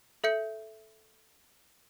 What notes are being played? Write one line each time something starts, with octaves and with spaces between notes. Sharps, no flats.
A4 E5 G6 C#7